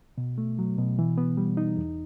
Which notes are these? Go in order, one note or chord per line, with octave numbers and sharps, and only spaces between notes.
B2
A3
F#3
B2
E3
B3
G3
D#4
E2